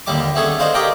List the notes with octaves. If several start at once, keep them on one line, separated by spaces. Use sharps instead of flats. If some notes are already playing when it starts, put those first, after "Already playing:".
D#2 D3 G3 D6
A3 B3 C#4 G#4 A4
D4 D#4 C5 F5
G4 G#4 A#4 G5